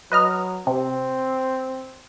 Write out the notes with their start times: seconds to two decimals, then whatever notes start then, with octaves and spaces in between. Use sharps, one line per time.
0.12 F#3 B4 D#5 F6
0.67 C3 C4